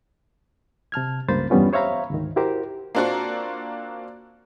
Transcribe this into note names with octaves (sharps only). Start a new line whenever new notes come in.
C3 A5 F6 G#6
C#2 G2 A#3 C5 B5 A6
E2 G2 G3 B3 C#4 F4
C5 C#5 E5 F5 A#5 B5
D2 G#2 D#3
E4 F#4 G4 A#4 C5
A#3 C4 D4 F4 F#4